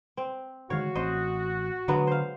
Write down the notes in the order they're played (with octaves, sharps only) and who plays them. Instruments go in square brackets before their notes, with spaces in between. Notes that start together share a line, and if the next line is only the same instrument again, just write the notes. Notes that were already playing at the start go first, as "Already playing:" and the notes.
[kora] C4
[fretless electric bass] D3 D#3 G#3 [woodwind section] F#4 [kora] C#5 F5
[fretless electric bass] A1 C4 [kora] C5 D#5
[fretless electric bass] D3 [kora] F#3 G#3 B3
[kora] C5 F5